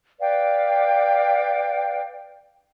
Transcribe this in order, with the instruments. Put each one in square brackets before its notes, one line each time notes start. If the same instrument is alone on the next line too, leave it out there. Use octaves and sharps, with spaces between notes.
[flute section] B4 D5 F5 G5